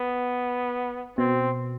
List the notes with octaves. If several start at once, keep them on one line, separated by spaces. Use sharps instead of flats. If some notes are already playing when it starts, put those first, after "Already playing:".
Already playing: B3
B2 C4